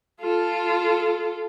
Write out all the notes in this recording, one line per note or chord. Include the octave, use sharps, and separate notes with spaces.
F4 A4